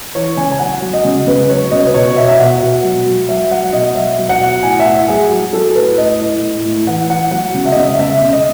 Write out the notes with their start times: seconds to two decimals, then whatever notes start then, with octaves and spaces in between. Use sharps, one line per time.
0.15 E3 C#5
0.37 C#3 G#5
0.52 G#5
0.59 F#3 F#5
0.82 F#3
0.93 D#5
1.05 C#3
1.27 C#3 B4
1.50 F#3 C#5
1.71 C#3 D#5
1.86 B4
1.94 B2 C#5
2.12 D#5
2.16 B2 E5
2.28 E5
2.39 B2 F#5
2.61 B2
2.84 F#3
3.06 F#3
3.29 F#3 E5
3.51 F#3 F#5
3.73 B2 D#5
3.95 F#3 E5
4.19 F#3
4.29 F#5
4.40 B2
4.62 A2 G#5
4.80 E5
4.85 A2 F#5
5.08 F#3 G#4
5.30 F#3
5.52 F#3 A4
5.75 A2 B4
5.98 A2 D#5
6.20 A2
6.42 A2
6.65 A2
6.87 E3 F#5
7.09 E3 F#5
7.31 F#3 F#5
7.54 C#3
7.65 E5
7.72 D#5
7.76 C#3 E5
7.99 C#3 E5
8.22 C#3
8.33 D#5